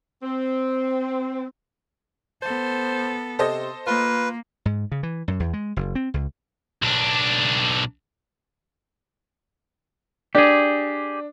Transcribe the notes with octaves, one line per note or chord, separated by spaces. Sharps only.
C4
B3 A4 C5
C3 A4 C5 D#5
A#3 F4 B4
G#2
C#3
E3
F#2
E2
G#3
F#1
C4
C#2
B1 D4
D4 G4 G#4